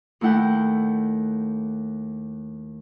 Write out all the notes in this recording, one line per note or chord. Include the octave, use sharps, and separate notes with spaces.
D#2 A3 E4 F#5 G5